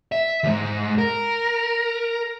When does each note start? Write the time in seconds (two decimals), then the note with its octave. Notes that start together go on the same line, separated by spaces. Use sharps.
0.12 E5
0.44 D#2 G#2
0.98 A#4